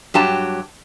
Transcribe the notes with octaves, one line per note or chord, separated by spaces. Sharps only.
G2 F#3 G4 A5